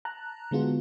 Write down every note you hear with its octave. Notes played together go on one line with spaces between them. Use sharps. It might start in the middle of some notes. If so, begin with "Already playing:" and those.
A5 A#5 F#6
D3 G#3 B3 F4 F#4